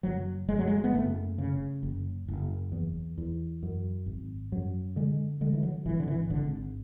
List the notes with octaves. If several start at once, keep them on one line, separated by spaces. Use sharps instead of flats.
F#1 F#3
F#1 G#3
F#3
G#3
B3
F#1 A3
C#3
F#1
F#1
E2
E2
F#2
G#1
F#2 F#3
D3 G#3
D3 G#3
E3
F#3
G#1 E3
D3
E3
G#1 D3